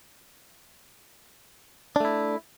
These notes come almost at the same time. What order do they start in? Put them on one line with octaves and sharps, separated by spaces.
D4 A3 E4